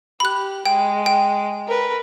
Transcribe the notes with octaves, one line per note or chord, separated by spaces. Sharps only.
G4 B5 F#6
G#3 G5
G5
A#4 B4